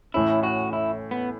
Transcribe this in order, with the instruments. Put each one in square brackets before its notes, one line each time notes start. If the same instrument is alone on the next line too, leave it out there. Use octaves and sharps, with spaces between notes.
[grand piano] A2 E3 A3 C#4 [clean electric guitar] E4
[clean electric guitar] F#4
E4
B3